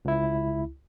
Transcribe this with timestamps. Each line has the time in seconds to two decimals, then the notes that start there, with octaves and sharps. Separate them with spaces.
0.05 C#2 E4